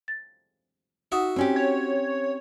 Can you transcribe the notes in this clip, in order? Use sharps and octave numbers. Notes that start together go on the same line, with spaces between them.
A6
D#4 F#4 E5 F#5 D#6
C4 C#4 G4
C#5